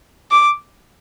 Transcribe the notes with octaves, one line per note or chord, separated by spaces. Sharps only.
D6